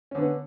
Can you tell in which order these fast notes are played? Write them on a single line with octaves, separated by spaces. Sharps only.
C#4 D3 B3